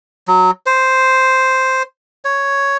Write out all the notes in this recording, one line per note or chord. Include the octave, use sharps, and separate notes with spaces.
F#3
C5
C#5